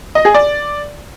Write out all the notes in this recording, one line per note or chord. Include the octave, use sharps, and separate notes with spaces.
D#5
G#4
D5